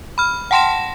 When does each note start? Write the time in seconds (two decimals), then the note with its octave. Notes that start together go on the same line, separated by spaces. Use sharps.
0.18 B5 F6
0.51 F#5 G5 A5 C6 A#6 E7